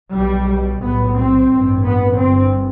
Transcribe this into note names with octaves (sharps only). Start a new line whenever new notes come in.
B1 B2 G3
B1 A2 B3
C4
A1 G2
B3
G1 G2 C4